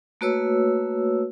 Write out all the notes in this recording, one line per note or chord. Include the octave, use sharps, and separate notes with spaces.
A3 A#3 F#4 B4 C#5 E6